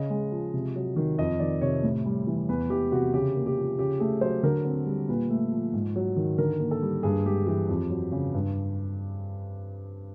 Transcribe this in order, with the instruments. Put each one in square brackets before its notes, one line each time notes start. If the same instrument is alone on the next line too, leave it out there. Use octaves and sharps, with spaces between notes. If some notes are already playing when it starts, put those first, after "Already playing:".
Already playing: [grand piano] C#3 D#5
G#3
F3
C3
F#3
D#3
F2 D#5
D#3 D5
C3 C#5
A2
G3
E3
E2 B4
E3 G4
C3 F#4
C#3 G4
A#3
G4
F3
C#3 G4
A3 G#4
F#3 C5
D3 A#4
C4
G3
A#2 B4
A3
F3
G#2
F#3
D#3
D3 A#4
A#3
A4
G3
G2 G#4
G#3 G4
E3 G4
F2
F#3
C#3
G2